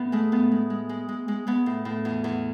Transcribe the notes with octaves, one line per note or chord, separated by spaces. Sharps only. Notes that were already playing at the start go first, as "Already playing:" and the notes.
Already playing: A2 B3
G#3 A3
A2 B3
G#3
G#3
G#3
G#3
G#3
G#3 B3
A2
A2
E2
E2